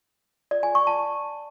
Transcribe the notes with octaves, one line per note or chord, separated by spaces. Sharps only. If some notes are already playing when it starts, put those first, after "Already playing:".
D5
G#5
C#6
A5